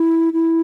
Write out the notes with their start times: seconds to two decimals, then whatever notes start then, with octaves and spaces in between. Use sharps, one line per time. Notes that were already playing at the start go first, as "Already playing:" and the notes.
Already playing: E4
0.33 E4